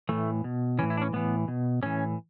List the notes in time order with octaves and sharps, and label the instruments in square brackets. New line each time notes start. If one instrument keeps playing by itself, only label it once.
[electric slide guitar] A2 E3 A3
B2
A2 E3 C#4
E4
D4
C#4
A2 E3 B3
B2
A2 E3 C#4